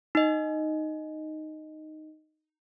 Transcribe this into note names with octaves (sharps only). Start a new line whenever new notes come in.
D#4 D#5